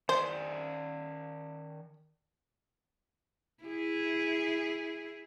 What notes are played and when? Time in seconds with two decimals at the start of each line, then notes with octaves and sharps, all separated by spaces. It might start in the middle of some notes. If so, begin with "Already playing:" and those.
0.09 D#3 C5 D5 G#5
3.64 E4 G#4